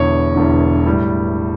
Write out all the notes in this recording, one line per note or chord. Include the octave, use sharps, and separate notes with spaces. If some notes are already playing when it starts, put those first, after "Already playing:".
Already playing: E1 E2 D3 C#5
E1 E2 D3
A2 G3